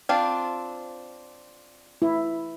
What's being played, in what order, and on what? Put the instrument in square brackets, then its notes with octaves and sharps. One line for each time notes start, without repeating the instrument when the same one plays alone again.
[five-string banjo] C4 D4 F4
[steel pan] E4